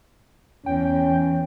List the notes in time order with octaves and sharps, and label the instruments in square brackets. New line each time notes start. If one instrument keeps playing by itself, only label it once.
[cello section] E2 [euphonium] C#4 [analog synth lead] G5